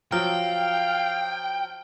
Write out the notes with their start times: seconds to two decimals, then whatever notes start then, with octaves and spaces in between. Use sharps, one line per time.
0.12 F3 F#3 F5 G5 F6